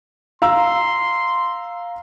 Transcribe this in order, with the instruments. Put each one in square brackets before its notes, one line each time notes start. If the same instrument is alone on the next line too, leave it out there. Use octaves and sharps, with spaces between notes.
[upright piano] F5 A#5 E6 [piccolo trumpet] C6